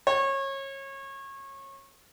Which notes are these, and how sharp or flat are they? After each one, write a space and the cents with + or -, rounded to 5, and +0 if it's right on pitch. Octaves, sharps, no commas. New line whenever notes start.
C#5 -25